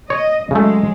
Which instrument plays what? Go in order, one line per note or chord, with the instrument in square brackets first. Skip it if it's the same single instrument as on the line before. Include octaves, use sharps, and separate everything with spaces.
[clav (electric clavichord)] C#5 [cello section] D#5
[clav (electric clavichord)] C#3 A3 [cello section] F#3 G#3